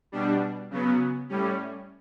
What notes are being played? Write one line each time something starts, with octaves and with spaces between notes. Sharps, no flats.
B2 G3 D4
C#3 F#3 B3
A2 G3 C#4